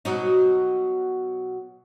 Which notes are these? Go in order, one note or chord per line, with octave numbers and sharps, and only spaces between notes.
B2 F#3 D#4